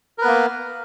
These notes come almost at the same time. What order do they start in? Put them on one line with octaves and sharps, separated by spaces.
A#4 B4 B3 A#3